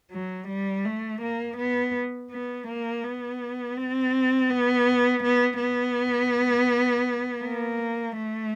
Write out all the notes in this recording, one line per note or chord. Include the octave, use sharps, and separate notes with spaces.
F#3
G3
A3
A#3
B3
B3
A#3
B3
C4
B3
B3
B3
A#3
A3